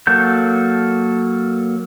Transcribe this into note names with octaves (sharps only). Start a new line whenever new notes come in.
F#3 A#3 A4 G6